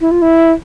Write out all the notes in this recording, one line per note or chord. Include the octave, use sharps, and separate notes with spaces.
E4
F4
E4